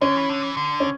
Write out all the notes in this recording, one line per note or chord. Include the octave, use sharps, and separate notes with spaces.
D3 C#4
E3
D3
E3
D3
C#4